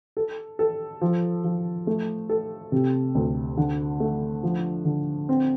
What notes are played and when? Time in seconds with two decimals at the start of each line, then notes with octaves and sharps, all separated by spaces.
0.17 A4
0.59 A4
1.01 F3
1.44 F3
1.87 A3
2.29 A4
2.72 C3
3.15 D2
3.57 D3
4.00 A3
4.43 F3
4.85 D3
5.29 C4